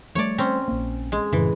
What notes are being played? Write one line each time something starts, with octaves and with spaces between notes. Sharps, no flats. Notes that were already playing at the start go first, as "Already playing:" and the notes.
F3 G3 A3 C#5 D5
C4 C#4 A#5
A#1 A#3
G#3
F#2 A2 C#3 E3